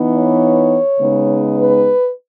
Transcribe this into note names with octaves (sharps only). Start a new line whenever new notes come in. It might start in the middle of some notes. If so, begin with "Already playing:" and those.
Already playing: E3 B3 D#4
C#5
C#3 G#3 B3 D#4
B4